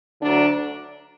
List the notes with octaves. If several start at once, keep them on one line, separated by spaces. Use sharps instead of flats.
D2 D3 F#3 D4